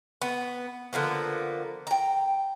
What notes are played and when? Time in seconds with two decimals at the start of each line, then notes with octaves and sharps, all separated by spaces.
0.22 B3
0.93 D3 F3 A#3 B3
1.87 G5 A#5